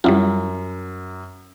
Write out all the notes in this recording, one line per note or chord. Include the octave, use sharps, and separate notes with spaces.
F#2 G3 E4 F4